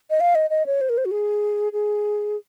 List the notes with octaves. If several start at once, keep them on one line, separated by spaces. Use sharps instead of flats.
D#5
F5
D#5
D#5
C#5
C5
A#4
C5
F#4
G#4
G#4